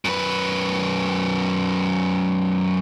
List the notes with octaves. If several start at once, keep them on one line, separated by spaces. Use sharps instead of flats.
F#2 B4